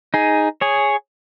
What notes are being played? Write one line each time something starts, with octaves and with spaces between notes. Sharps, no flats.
D#4 G#4
G#4 C#5